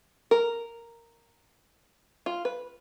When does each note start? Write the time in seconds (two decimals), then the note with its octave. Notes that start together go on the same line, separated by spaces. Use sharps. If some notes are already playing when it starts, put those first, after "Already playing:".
0.31 A#4
2.26 F4
2.45 B4